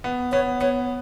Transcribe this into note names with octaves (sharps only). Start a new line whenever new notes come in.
B3
B3 C#5
B3 C#5